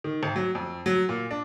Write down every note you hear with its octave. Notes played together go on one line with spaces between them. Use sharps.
D#3
G#1
F#3
F2
F#3
A#2
D4